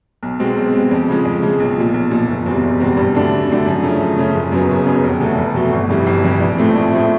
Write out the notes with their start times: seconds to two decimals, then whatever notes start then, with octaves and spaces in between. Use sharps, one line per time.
0.23 B1
0.39 B2 G#3 C4
0.57 B1
0.74 B2 G#3 C4
0.91 F2
1.08 C#3 F3 G#3
1.25 F2
1.42 C#3 F3 G#3
1.60 B1
1.77 A#2 F3
1.94 B1
2.11 A#2 F3
2.28 F#1
2.46 E2 B2 G3 C4
2.63 F#1
2.80 E2 B2 G3 C4
2.97 G2
3.15 D3 F#3 A3 D4
3.31 G2
3.49 D3 F#3 A3 D4
3.66 F#2
3.83 C#3 F3 A3 C#4
4.00 F#2
4.17 C#3 F3 A3 C#4
4.35 F#1
4.52 F#2 C#3 F#3 B3
4.69 F#1
4.86 F#2 C#3 F#3 B3
5.04 F1
5.20 E2 B2 F#3 A3
5.38 F1
5.56 E2 B2 F#3 A3
5.73 G1
5.89 F2 C3 E3 G3
6.07 G1
6.24 F2 C3 E3 G3
6.41 A#1
6.58 A2 F3 A3 C4
6.75 A#1
6.93 A2 F3 A3 C4